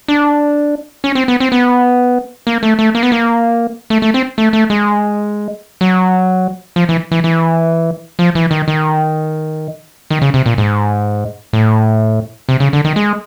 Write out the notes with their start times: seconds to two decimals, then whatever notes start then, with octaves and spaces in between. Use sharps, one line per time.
0.08 D4
1.04 C#4
1.15 C4
1.28 B3
1.40 C4
1.52 B3
2.47 A#3
2.63 A3
2.79 A3
2.95 A#3
3.03 B3
3.12 A#3
3.90 A3
4.02 A3
4.14 C4
4.38 A3
4.53 A3
4.70 G#3
5.81 F#3
6.76 F3
6.89 E3
7.12 E3
7.24 E3
8.19 F3
8.35 E3
8.51 D#3
8.68 D#3
10.11 D#3
10.22 C#3
10.34 C3
10.46 A#2
10.58 G#2
11.53 A2
12.49 C3
12.60 C#3
12.73 D3
12.85 D#3
12.96 G#3